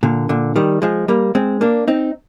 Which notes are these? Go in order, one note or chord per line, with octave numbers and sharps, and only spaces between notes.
A#2 D3
A#2 D3
D#3 G3
F3 G#3
G3 A#3
G#3 C4
A#3 D4
C4 D#4